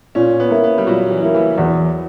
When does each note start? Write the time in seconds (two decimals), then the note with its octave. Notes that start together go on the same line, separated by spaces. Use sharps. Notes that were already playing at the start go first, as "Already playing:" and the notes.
0.15 A#2 C#4
0.40 B3
0.51 A#3 E4
0.64 B3
0.78 G3
0.87 A#2 F#3
1.11 E3
1.22 A#3 E4
1.35 E3
1.57 E2 F#3